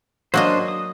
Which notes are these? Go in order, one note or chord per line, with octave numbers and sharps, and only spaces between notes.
F#3 A#3 D4 F#4 C5 D#5
D#6